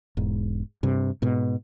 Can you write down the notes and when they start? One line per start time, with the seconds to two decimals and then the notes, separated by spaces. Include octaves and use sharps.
0.17 E1 G#2
0.83 G2 C3
1.22 G#2 B2